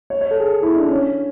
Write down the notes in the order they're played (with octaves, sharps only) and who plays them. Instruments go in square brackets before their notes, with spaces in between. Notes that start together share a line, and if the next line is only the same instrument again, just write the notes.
[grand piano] C#5
C#5
A4
G#4
E4
D4
C#4